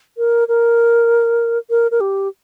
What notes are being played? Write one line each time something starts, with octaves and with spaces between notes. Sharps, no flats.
A#4
A#4
A#4
A#4
G4